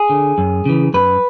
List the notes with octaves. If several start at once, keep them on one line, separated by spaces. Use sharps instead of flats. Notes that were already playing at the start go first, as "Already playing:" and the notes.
Already playing: G#4
D3
F#2
C#3 E3
F#2 B4